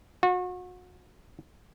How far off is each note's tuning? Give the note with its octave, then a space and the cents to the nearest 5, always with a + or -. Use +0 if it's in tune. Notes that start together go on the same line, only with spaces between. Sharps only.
F#4 -35